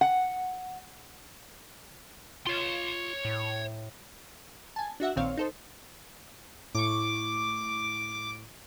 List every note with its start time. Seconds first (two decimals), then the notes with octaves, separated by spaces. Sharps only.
0.01 F#5
2.47 F4 C#5 C6
3.25 A2
4.76 G#5 A5
5.00 D4 F#4 E5 F#5
5.16 A#1 A#2 D#3 C4 C#5 F5
5.37 D#4 A4 C5
6.75 A2 C#6 D6